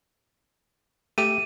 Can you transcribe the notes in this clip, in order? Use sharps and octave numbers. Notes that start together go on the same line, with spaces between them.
A3 G4 D#7